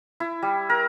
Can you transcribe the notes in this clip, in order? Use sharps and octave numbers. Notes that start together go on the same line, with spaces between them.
E4
G3
A#4